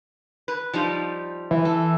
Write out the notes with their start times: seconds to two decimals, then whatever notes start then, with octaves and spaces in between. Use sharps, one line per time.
0.48 B4
0.73 F3 G3 D#4
1.51 E3
1.65 A4